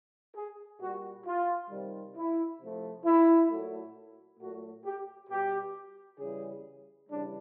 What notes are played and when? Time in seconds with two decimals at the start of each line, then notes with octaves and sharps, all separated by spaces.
0.35 G#4
0.80 A#2 G3 F#4
1.25 F4
1.70 C3 D#3 G3
2.15 E4
2.60 C3 F3 A3
3.05 E4
3.49 A#2 F#3 A3
4.39 A#2 F#3 A3 F#4
4.84 G4
5.29 B2 G3 G4
6.19 C#3 E3 G3 G#4
7.09 C#3 E3 G3 D4